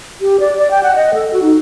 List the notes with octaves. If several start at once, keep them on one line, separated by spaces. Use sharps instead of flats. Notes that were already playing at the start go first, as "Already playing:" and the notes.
G4
D5
D5
G5
F#5
D#5
A4
F#4
D#4